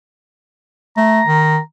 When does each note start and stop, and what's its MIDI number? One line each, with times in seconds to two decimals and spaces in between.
0.97 1.21 57
0.97 1.60 82
1.27 1.59 51